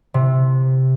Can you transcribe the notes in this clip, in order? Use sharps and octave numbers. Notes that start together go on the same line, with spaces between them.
C3